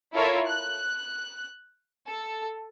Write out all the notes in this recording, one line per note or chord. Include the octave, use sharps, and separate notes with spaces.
E4 F4 A4 A#4 C#5 E5
F#6
A4